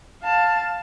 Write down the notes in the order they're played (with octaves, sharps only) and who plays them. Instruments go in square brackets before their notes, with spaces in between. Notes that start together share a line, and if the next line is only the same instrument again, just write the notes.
[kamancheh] F5 A5